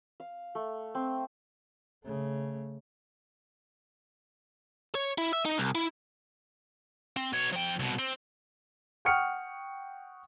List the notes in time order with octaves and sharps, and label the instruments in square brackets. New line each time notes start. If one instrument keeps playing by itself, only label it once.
[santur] F5
A3
C4
[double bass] C#3 A3
[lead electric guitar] C#5
E4
E5
D#4
C2
E4
[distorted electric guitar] C4
B2 C#5
F3 G5
C2 B2
C4
[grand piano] F#5 G5 C#6 D#6 F6 C#7